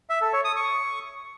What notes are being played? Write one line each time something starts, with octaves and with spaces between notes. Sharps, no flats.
E5
A4
C#5
D#6
C#6